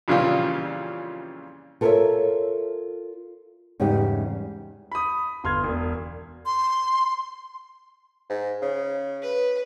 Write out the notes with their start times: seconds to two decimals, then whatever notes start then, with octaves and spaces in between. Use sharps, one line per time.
0.08 F2 A#2 C#3 E3 G3 F4
1.81 F4 A4 A#4 C5 C#5 E5
3.80 E2 G#2 C#3 G3 D#4 G4
4.92 B5 D#6
5.44 G1 C6 F6 G#6
5.64 E1
6.46 C6
8.30 G#2
8.62 C#3
9.22 B4